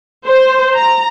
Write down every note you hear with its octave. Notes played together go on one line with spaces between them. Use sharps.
C5
A#5